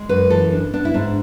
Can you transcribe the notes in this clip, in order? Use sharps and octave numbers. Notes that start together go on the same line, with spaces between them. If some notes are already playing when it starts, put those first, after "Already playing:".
Already playing: G#3
F#2 B4
E3 A4
D4
B3 D4
E4
G#2 D4